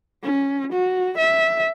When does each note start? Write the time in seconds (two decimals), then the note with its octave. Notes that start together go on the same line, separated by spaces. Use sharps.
0.23 C#4
0.73 F#4
1.18 E5